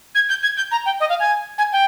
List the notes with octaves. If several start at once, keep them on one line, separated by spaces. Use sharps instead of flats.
G#6
G6
G#6
G6
A#5
G5
D#5
F5
G#5
G#5
G5